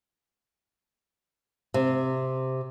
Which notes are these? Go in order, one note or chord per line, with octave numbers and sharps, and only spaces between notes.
C3